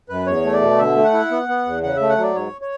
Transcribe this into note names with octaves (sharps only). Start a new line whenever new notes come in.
F#2 B4
E2 C#5
A3
D5
B2
D3 E5
A3
F#5
E4
B3
B3
E2
C#3 F#5
E5
A3
F#5
F#3 D5
G#2 C#5
C#5